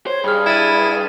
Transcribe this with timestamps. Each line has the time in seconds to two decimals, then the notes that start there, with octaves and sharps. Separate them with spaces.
0.07 C5 C#5
0.24 G2 G#4 B5 F6
0.46 E4 G#6 A6 D#7